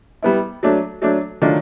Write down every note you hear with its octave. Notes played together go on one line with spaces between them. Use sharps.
G3 B3 E4
F#3 A3 D4
F#3 A3 D4
D#3 F#3 A3 D4 F4